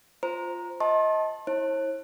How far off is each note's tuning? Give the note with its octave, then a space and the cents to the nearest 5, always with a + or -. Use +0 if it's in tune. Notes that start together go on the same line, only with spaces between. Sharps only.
F4 +5 C5 +0 A#5 +0
D#5 +25 A5 +0 C6 +40
E4 -25 C#5 -45